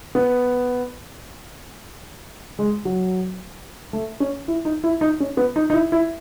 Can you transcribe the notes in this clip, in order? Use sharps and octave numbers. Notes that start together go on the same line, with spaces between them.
B3
G#3
F#3
A3
C#4
E4
D#4
E4
D#4
C#4
B3
D#4
D#4
E4
E4